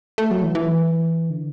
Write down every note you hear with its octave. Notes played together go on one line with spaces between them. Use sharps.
A3
F#3
E3
E3
D3